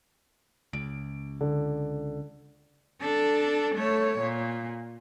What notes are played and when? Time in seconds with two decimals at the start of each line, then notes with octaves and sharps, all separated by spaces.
0.73 C#2 D7
1.41 D3
3.01 D4 A4
3.76 A3 C#5
4.19 A#2